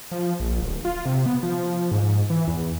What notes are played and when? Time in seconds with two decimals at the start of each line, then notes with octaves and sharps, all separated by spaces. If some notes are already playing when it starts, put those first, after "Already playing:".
0.11 F3
0.40 A#1
0.61 D1
0.85 F4
1.05 C3
1.26 B3
1.43 F3
1.91 G#2
2.30 E3
2.48 E2